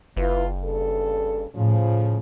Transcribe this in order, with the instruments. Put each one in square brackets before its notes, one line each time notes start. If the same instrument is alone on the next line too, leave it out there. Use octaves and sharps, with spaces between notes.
[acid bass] F#1 [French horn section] E4 F4 B4
[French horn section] G2 C#3 A4
[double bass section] A2 [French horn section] C#3 F3